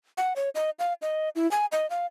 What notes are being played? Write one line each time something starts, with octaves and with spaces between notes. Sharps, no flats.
F#5
C#5
D#5
F5
D#5
E4
G#5
D#5
F5